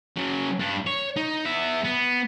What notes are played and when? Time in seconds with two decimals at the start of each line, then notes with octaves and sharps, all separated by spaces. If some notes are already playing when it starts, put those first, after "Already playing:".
0.17 C#3 F#3
0.60 G2 D4
0.87 C#5
1.16 D#4
1.45 B3 E5
1.85 B3